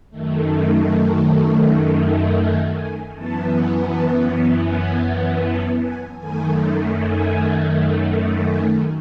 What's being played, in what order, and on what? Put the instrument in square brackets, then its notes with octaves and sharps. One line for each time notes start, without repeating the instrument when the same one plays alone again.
[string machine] F#2 D#3 A3
G#5
G#5
F#2 E3 B3 A5
A5
G#5
G#5
A5
G#5
F#2 D#3 A3 G#5
G#5
G#5